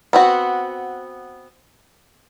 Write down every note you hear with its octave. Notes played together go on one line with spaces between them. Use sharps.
B3 C4 F#4